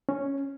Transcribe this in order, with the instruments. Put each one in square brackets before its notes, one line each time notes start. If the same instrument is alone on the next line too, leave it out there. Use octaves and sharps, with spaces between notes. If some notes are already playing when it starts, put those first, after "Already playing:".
[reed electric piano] C#4